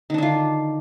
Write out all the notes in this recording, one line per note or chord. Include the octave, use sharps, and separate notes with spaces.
D3 D#3 D4 F4